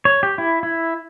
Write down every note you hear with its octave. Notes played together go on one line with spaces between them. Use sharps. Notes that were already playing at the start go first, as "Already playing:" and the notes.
C#5
G4
E4
E4